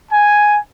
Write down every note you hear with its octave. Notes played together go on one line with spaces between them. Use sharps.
G#5